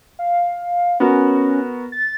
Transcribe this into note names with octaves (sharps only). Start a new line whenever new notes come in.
F5
B3 C#4 F#4 A#4
A6